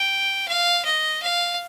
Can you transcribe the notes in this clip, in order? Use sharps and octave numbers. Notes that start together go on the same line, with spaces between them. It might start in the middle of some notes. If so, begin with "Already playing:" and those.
Already playing: G5
F5
D#5
F5